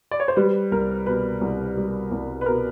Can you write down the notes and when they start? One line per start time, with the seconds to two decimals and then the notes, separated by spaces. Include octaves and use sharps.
0.11 D5
0.20 C#5
0.28 C5
0.36 G3 B4
0.72 C2 A#4
1.06 B2 B4
1.41 C2
1.77 G3
2.12 C2
2.41 B4
2.46 B2 A#4